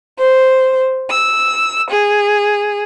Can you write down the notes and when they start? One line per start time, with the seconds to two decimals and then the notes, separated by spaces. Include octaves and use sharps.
0.19 C5
1.10 E6
1.91 G#4